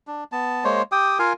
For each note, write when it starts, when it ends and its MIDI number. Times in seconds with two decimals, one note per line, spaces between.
0.07 0.24 62
0.32 0.64 59
0.32 0.64 81
0.64 0.82 56
0.64 0.82 58
0.64 0.82 72
0.64 0.82 73
0.92 1.18 67
0.92 1.18 79
0.92 1.18 87
1.19 1.33 65
1.19 1.33 70
1.19 1.33 77
1.19 1.33 80